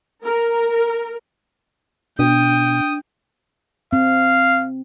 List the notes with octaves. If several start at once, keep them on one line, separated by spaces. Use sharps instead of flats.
A#4
B2 D4 G5 D#6
C4 F5